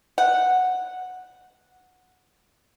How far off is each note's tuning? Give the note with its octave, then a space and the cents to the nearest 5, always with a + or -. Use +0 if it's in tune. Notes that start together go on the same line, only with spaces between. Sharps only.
F#5 -10